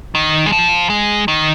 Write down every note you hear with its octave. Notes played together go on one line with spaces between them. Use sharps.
D#3
G#3
F3
G#3
D#3